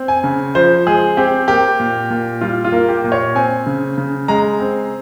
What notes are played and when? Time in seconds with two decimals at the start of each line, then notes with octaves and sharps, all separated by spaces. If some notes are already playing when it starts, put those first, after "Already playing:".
Already playing: C4
0.08 G#5
0.24 C#3
0.55 F3 C5
0.86 G#3 G#4
1.17 C4 G4
1.48 A#3 G4
1.80 A#2
2.10 A#2
2.41 G3 F4
2.64 F4
2.72 A#3
2.89 G4
3.04 A#2
3.12 C#5
3.35 C4 G#5
3.66 C#3
3.98 C#3
4.28 G#3 A#5
4.60 C4